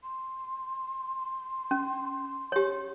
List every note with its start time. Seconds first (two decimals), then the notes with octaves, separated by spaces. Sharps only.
0.03 C6
1.71 C#4
2.52 G4 C#5